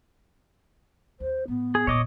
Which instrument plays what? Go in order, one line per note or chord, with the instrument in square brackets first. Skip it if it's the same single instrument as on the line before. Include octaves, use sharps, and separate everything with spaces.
[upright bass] D#2 [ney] C5
[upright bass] A2 [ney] B3
[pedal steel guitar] G#4
[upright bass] E1 A#2 [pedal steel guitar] C#5 D#5 D6